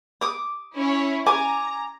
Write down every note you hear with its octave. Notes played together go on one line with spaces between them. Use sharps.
D6 D#6
C#4 E4 C#5
G#5 A#5 D6